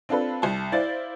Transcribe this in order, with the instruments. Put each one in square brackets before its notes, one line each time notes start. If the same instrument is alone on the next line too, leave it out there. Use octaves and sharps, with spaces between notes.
[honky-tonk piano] C4 D4 F4 A4 B4
C2 A5
E4 C5 D5 F5 A6